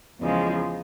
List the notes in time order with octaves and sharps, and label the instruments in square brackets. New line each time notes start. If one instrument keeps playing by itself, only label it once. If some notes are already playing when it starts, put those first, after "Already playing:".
[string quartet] E2 C#3 F3 G#3